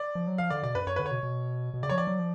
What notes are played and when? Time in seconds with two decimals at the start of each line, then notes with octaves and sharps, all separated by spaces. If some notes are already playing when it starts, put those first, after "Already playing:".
Already playing: D5
0.15 F3
0.27 F#3
0.38 F3 F5
0.50 D3 D5
0.63 B2 D5
0.75 F#2 B4
0.87 F#2 C#5
0.96 D3 B4
1.06 C#5
1.11 B2
1.23 B2
1.74 B2
1.83 C#3 D5
1.89 F#3 C#5
1.95 F3 D5
2.07 F#3
2.19 F3